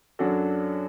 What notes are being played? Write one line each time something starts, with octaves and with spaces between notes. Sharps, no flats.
F#2 F#3 D4 F#4 A4